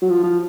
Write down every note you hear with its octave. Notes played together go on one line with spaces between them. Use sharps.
F#3
F3
F3